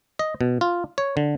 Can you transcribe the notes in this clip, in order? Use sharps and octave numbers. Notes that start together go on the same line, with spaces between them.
D#5
B2
F4
C#5
D3